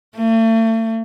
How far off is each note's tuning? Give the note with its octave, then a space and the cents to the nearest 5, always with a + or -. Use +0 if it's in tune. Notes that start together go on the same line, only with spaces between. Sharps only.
A3 +40